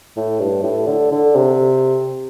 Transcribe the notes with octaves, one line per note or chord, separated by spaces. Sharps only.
A2
G2
A2
D3
D3
C3